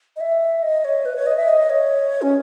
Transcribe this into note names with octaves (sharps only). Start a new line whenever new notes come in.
D#5
E5
D#5
C#5
B4
C#5
D#5
E5
D#5
C#5
C#4